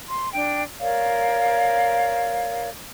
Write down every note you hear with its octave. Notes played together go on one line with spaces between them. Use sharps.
C6
D4 G5
A#4 C#5 D5 F5